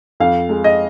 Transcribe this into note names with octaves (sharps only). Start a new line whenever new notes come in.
F2 F5
G#3
D#5